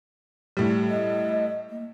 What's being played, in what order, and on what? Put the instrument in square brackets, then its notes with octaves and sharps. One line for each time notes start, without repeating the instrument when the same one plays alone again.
[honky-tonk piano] A2 G3
[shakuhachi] D#5
A#3